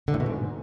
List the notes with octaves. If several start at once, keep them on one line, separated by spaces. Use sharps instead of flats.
D3
A2
B2
G#2